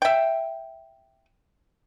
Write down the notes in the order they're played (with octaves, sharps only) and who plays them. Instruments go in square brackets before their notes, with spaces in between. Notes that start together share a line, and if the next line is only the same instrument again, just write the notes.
[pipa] E5 G5